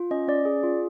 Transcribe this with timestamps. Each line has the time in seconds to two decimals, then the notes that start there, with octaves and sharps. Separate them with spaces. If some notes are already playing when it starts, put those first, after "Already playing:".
Already playing: F4
0.11 C#4 D#5
0.28 C#4 D5
0.45 G#4
0.63 F4